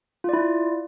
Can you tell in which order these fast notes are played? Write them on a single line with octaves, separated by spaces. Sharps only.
F4 D5 E4